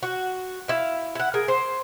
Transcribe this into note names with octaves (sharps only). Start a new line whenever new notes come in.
F#4
E4 F5
E4 F#5
G#4 A#4
C5